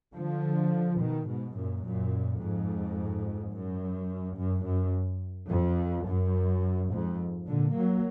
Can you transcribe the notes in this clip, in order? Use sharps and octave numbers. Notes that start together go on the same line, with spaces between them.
D3 F3
B2 D#3
G#2 B2
F#2 A#2
F#2 A#2
F2 G#2
F#2
F#2
F#2
F2
F#2
F2 G#2
A#2 D3
F#3 A#3